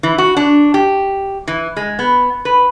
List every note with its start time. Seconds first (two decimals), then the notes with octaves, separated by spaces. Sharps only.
0.03 E3
0.18 F#4
0.37 D4
0.74 G4
1.48 E3
1.77 G#3
1.99 B3
2.45 B4